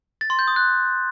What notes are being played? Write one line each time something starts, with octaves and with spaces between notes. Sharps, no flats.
A6
C6
G6
D#6
F#6